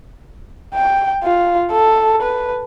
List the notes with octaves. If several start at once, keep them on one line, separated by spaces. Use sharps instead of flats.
G5
F4
A4
B4